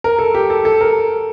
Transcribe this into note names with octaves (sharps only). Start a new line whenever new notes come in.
A#4
A4
G4
A4
A4
A#4